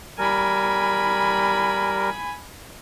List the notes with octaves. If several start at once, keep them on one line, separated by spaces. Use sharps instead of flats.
G3 A#4 G#5 B5